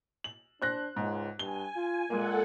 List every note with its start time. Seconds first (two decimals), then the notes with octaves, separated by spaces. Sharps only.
0.24 F#7
0.62 D4 C5 F#6 A#6
0.96 C#2 G#2
1.39 G2 G#5 G7
1.76 F4
2.10 A#2 G#3 A#3 A4 F#5